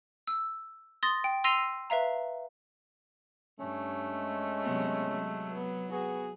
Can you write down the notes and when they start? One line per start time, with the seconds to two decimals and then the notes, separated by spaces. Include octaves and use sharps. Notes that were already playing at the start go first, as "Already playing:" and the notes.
0.27 E6
1.03 C6 D#6 A6 A#6
1.24 G5
1.44 C6 E6 A#6 C7 D#7 F7
1.90 B4 E5 F5 A#5
3.60 G2 A3 C#4
4.13 G#3
4.63 C3 F#3 B3
5.10 F#3
5.51 B3
5.91 B3 F#4 G#4